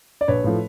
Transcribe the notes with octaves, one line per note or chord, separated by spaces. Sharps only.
D5
A#1 B4 C#5
A2 F3 A3